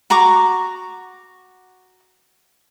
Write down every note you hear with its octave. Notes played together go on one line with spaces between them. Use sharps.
F#4 A#5 C#6 D6